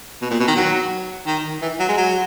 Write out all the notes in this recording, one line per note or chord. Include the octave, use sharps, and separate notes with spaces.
B2
A#2
B2
D#3
F#3
D#3
E3
F#3
G#3
F#3